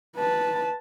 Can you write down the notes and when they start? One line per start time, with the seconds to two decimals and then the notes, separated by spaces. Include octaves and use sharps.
0.16 B4 A5